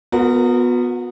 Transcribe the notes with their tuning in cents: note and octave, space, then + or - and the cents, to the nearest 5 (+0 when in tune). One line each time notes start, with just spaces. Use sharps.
B3 +0 F#4 -40 A#4 -25